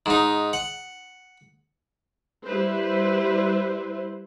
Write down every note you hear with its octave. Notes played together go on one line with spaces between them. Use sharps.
G#2 D#4
F#5
G3 E4 B4 C5